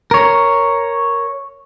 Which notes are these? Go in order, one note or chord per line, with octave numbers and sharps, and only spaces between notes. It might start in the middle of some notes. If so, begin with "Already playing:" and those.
A#4 C#5